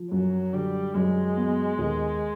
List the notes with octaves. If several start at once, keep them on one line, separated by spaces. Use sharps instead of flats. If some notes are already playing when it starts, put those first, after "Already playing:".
Already playing: F3
F#2 F#3
D3 G3
F#2 G#3
B3
D#2